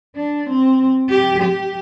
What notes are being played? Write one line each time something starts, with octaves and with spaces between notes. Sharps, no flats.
D4
C4
G4
G4